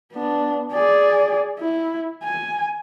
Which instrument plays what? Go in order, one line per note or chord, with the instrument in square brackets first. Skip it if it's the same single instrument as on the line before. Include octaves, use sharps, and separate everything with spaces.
[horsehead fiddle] B3 D4
G#4 D5
E4
G#5